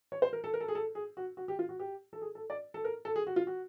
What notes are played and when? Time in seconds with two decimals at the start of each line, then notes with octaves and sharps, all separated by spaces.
0.12 C#5
0.22 C5
0.33 A#4
0.44 A4
0.54 A#4
0.61 A4
0.68 G#4
0.75 A4
0.95 G#4
1.17 F#4
1.37 F#4
1.48 G4
1.59 F4
1.69 F#4
1.80 G4
2.13 A4
2.21 G#4
2.35 A4
2.50 D5
2.74 A4
2.84 A#4
3.05 A4
3.16 G#4
3.27 F#4
3.36 F4
3.47 F#4